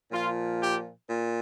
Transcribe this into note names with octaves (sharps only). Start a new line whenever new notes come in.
A#2 F3 F4
G4
A#2